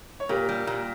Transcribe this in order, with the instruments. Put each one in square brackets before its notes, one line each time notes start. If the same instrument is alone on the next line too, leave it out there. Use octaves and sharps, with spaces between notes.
[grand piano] C#5
[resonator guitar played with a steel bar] A#2 [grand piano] G4 A#4
[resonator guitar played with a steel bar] G3
A#2